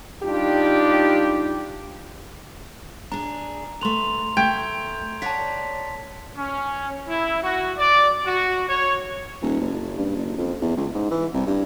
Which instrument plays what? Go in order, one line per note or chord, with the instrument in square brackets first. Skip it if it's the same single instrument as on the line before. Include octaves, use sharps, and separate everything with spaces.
[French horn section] G3 D4 D#4 F4 G4
[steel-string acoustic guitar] D4 G#4 [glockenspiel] A#5
[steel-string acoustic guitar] A3 B4 [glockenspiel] C6 F7
[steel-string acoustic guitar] A3 [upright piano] G5 [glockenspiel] G#6
[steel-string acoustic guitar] C#5 D5 F#5 [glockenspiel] A5 B6
[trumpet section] C#4
E4
F#4
D5
F#4
C#5
[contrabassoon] D#1
F#1
G2
F#1
F2
E2
C#2
G#2
E3
C2
G2